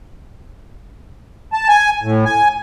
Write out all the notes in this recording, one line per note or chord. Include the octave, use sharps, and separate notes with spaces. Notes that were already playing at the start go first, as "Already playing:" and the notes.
A5
G#5
A2
G#5